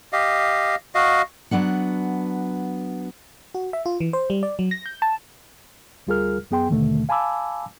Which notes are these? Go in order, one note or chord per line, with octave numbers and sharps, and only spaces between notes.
G4 D#5 F5
F#4 D#5 F5
F#3 B3 D4 F#5
F#4
E5
F4
E3
C5
G3
D5
F#3
A#6
G6
A5
D2 G3 F4 G#4 A#4 F6
F#2 B3 G#4 G5 C6
D#2 B2 D3 D#3 A3
F5 G#5 A5 B5 D6 E6